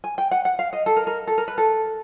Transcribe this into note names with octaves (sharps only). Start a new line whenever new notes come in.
G#5
G5
F#5
F#5
F5
D#5
A4
A#4
A#4
A4
A#4
B4
A4